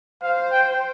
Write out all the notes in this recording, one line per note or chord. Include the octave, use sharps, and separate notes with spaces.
C5 F5
G5